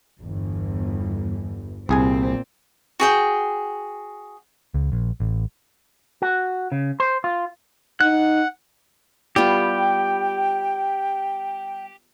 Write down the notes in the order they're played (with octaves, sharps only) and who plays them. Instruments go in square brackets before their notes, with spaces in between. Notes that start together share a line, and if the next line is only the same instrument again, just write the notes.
[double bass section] G1 [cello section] E2
[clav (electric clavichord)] C2 G#4 G#5 [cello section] A#2 C4
[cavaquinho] F#4 G#4 G5
[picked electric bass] C#2
A#1
A1
[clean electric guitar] F#4
C#3
C5
F4
[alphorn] D#4 [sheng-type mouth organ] F#5 [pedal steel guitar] F#6
[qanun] G3 B3 F4 [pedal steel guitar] G4 [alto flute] G5